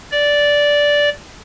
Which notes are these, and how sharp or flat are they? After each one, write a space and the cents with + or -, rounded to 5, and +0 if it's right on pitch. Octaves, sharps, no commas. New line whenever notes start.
D5 -10